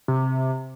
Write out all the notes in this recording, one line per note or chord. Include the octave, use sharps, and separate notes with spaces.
C3